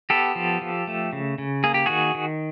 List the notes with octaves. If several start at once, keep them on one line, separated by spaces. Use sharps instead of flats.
B3 G4 A4
F3
F3
A3
C#3
C#3
A#3 G#4
G4
D#3 F#4 G#4
D#3